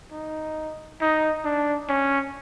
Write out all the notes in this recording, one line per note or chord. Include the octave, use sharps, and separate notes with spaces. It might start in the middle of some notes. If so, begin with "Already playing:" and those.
D#4
D#4
D4
C#4